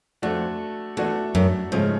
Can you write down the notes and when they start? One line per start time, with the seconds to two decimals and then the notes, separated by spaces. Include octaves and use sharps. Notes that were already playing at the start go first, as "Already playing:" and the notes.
0.22 F2 A3 D4 F#4 A4
0.97 E2 A3 D4 F#4 A4
1.35 F#2
1.72 G#2 C#3 F3 A3 C#4